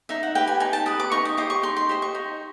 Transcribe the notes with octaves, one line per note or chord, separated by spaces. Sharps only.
D#4 E5
F#5
G4 B4 G5
G#5
D#4 G#5
A5
G4 B4 D#6
D6
D#4 C#6
D#6
G4 C5 D#5 D6
C#6
D#4 C6
C6
G4 C5 D#5
C#6
D#4